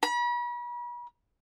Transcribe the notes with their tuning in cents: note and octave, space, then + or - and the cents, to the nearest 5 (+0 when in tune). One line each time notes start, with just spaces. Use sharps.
B5 -40